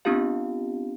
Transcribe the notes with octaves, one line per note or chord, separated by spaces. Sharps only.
B3 C4 D4 F4 G4 F5